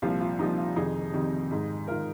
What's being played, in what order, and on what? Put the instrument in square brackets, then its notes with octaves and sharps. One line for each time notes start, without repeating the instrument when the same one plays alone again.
[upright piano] C2 A#2 F3 F4
F4
C2 A#2 F3 D#4
F4
F2 C3 D#3 D#4 G#4
F2 C3 D#3
G#2 D#3
G#2 D#3 F4 A#4